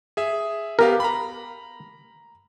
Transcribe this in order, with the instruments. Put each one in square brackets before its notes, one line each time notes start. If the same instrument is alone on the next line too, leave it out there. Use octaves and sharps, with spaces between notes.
[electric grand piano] G#4 E5
[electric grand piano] B3 G4 F5 [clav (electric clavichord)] A#4
[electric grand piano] A#5 B5